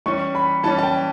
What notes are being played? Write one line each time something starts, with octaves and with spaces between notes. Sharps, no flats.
E3 G3 C#4 C#6
B5
E3 G3 C#4 A5
A5
G5